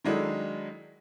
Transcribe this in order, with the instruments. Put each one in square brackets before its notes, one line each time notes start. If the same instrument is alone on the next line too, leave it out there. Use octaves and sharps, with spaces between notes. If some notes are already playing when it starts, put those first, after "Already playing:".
[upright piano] D#3 F#3 G#3 D4 E4 A4